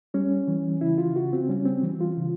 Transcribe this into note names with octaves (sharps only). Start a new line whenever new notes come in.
G3 C#4
E3
C#3 E4
F4
C#3 F#4
C4
G3 C#4
C4
E3
F4
C#3